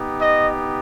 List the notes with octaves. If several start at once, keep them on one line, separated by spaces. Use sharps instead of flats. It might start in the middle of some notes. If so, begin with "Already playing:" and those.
Already playing: B3 D#4 G4
D#5